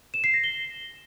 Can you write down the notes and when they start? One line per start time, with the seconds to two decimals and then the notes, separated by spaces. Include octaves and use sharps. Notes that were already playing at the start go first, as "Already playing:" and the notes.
0.14 E7
0.24 C7
0.34 A#6
0.44 G7